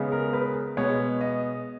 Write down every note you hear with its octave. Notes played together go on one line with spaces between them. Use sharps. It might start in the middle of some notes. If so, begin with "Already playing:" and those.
Already playing: C#3 G#3 B3
A#4
B4
B2 G#3 B3 C#5
D#5